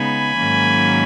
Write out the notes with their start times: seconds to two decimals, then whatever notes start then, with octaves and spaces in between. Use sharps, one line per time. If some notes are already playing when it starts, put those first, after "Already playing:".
Already playing: C#3 G#3 B3 D#4 G#5 B5
0.36 G#2 D#3 F#3 A#3 C#4